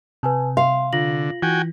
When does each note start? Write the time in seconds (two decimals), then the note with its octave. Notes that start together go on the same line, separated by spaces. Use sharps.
0.23 C3 B4 G#5 A5
0.57 F5 C6
0.93 D3 F4 A#6 F#7
1.42 E3 F#4 G5 G#5